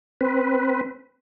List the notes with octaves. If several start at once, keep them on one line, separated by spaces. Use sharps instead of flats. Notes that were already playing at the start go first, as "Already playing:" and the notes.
C4 B4